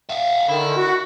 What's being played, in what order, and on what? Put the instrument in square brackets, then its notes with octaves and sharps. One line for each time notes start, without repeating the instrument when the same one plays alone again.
[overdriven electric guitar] E5 F5
[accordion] D3 D#3 [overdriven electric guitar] E4
[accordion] F#4